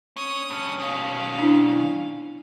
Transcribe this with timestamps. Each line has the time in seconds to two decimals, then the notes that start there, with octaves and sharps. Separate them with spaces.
0.17 C#4 D#6
0.50 G2 C#4
0.79 B2 D#3 C#4 F5
1.39 D4 E4